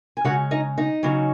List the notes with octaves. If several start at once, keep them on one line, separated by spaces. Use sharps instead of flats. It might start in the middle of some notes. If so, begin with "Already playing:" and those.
G#5
C#3 G#3 C#4 F#4 F#5
D#4 D#5
D#4 D#5
C#3 F#3 C#4